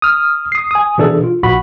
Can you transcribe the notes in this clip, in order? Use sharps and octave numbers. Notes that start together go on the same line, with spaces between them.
D#6 F6
D#6 C7
G#5 D#6
B2 E3 D4 G#4 A4
F4
A#1 F#4 B5